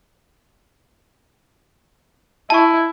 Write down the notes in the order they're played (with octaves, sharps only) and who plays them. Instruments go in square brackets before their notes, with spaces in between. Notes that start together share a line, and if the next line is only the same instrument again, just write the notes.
[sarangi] E4 [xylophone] A5 C#6